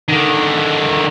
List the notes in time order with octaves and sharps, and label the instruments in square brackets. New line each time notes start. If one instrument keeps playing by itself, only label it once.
[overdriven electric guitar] D3 D#3